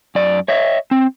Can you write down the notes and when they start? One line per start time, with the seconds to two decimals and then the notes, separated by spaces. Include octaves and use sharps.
0.15 F#2 D5
0.48 C#5 D#5 E5
0.91 C4